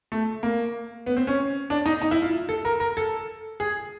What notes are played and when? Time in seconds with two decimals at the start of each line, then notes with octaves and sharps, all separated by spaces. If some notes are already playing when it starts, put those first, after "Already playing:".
0.12 A3
0.43 A#3
1.06 B3
1.17 C4
1.27 C#4
1.70 D4
1.86 D#4
2.02 D#4
2.11 E4
2.22 F4
2.49 A4
2.65 A#4
2.80 A#4
2.97 A4
3.60 G#4